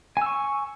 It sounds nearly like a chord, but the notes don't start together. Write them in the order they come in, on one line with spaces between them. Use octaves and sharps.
G#5 E6 C#6